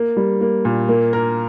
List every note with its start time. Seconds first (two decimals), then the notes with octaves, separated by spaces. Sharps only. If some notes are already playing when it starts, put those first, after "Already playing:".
Already playing: A#3
0.17 G3
0.41 A#3
0.65 A#2
0.88 A#3
1.13 A#4